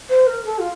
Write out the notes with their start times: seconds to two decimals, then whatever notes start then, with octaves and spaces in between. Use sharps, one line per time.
0.10 C5
0.27 A#4
0.45 A4
0.59 F4